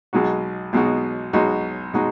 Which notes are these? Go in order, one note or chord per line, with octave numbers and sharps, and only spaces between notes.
B1 B2 G#3 D#4 F#4
B1 B2 G#3 D#4 F#4
B1 B2 G#3 D#4 F#4
B2 G#3 D#4 F#4